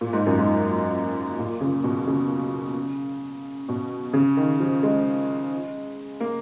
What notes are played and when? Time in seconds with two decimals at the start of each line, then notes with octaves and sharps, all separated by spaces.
0.01 A#2
0.13 G#2
0.26 F#2
0.39 G#2
1.39 A#2
1.61 C#3
1.84 B2
2.07 C#3
3.69 B2
4.13 C#3
4.37 D#3
4.60 F3
4.83 G#3
6.20 A#3